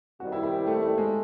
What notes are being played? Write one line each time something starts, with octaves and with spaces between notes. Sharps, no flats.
C2 C3 D#3 G3 F#4
E4
E4
A3
A3
G#3